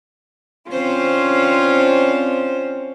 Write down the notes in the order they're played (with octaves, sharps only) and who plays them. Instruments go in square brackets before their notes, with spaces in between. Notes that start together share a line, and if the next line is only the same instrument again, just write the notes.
[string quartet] D3 C4 C#4 F4 C5